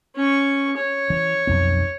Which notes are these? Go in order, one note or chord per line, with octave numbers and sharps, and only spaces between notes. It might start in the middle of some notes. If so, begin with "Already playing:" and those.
C#4 C#6
C#5
E3
B1 F2 B3